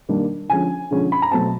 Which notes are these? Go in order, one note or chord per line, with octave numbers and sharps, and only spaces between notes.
D#3 G3 A#3 D4
D3 F3 G#3 C#4 G#5
D3 F3 G#3 C#4
B5
A#5
B2 F#3 A3 C4 A5